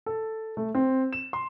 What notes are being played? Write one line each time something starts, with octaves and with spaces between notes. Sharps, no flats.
A4
A3
C4
E7
C6